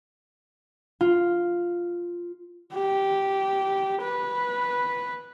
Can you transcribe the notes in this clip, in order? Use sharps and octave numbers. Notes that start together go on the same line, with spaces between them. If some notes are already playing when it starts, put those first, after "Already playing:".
F4
G4
B4